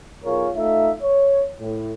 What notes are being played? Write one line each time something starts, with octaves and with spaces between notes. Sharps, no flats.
B1 F4 G#4 A#4 C#5
A3 D#4 F4 E5
C#5
A2